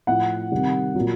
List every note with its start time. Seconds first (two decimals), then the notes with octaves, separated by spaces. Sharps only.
0.07 A2 F3 F#5
0.52 C3 D#3 G3
0.95 A#2 F#3